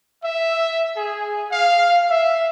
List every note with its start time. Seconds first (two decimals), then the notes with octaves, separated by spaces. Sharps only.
0.23 E5
0.96 G#4
1.51 F5
2.09 E5